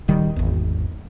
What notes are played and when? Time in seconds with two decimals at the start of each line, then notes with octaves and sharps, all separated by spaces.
0.08 D1 D#3 G3
0.36 G#1 E2